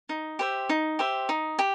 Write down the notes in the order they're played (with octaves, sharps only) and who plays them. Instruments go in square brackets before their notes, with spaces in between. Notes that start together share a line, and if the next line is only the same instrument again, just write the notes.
[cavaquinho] D#4
G4 C5 E5
D#4
G4 C5 E5
D#4
G4